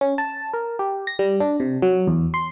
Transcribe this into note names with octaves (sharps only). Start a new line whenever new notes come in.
C#4
A5
A#4
G4
A#6
G3
D4
C3
F#3
E2
C6